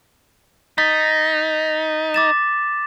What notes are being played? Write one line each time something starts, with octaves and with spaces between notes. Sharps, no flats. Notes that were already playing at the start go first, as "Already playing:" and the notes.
D#4 A6 B6
D6 A6 E7